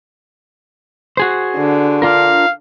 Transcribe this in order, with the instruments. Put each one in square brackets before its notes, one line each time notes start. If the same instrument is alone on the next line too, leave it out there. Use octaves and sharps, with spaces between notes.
[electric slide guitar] F#4 G#4 C5
[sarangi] D3
[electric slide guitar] D4 F4 A#4 [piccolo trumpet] F5